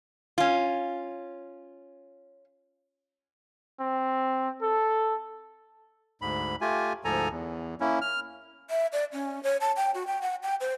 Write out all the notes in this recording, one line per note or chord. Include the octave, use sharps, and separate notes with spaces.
C#4 F4
C4
A4
D2 G#2 B5
A3 F4 G4 G#5
D2 G#2 F3 A4 G#5 A#5
E2
A#3 C#4 E4
F6
E5
D5
C#4
C#5
A5
G5
F#4
G5
F#5
G5
C5